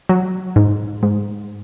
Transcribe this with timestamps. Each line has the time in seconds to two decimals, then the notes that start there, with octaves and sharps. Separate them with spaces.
0.09 F#3
0.56 G#2
1.03 G#2